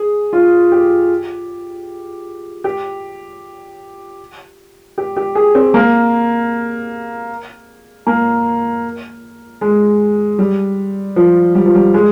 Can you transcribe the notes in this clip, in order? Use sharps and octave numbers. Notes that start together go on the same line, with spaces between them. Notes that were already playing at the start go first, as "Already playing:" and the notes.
Already playing: G#4
F4
G4
G4
G4
G4
G#4
C4
A#3
A#3
G#3
G3
F3
G3
F3
G3
G#3